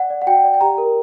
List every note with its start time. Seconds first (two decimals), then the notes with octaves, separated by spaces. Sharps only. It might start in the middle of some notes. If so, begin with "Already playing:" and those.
Already playing: D5 F#5
0.10 D5
0.22 F#5
0.27 F#4 G5
0.44 D5
0.54 G5
0.61 G4 A#5
0.78 A#4